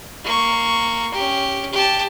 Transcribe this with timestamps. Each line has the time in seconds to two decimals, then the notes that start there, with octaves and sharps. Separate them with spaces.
0.25 A#3 C#6
1.14 C#4 G4
1.73 G4 A5